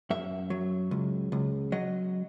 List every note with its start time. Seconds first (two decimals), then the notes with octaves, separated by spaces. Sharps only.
0.10 F#2 E5
0.50 F#3
0.91 C#2
1.32 C#2
1.72 F#3 D#5